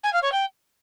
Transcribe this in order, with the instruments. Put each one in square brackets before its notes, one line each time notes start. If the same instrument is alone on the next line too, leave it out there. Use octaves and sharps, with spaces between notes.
[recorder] G#5
F5
C#5
G5